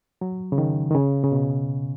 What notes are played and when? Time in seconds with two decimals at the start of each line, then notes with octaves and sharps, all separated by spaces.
0.21 F#3
0.52 C#3
0.58 D#3
0.91 D#3
0.95 C#3
1.23 C#3
1.32 B2